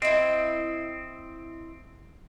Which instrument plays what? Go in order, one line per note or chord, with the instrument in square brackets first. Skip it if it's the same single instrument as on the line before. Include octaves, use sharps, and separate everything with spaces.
[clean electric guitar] C4 [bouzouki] E4 D#5